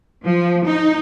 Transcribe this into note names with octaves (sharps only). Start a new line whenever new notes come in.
F3
D#4